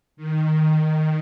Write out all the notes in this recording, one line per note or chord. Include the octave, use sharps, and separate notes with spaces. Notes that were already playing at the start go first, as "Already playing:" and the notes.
D#3